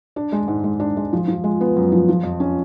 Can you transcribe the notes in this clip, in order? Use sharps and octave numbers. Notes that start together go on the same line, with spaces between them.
D4
G#3
G#2
G#3
D4
G#3
F3
F3
G#3
B3
F#2
F3
F3
F2
C#4